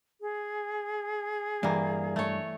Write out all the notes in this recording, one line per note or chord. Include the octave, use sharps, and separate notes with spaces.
G#4
G2 E3 A#3
A3 C#5